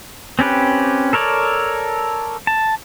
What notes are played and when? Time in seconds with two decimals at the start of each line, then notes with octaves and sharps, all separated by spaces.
0.39 C4 C#4 G4 B4
1.13 A4 A#4 C#5 D5
2.47 A5